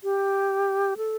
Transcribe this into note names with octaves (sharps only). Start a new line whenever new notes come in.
G4
A4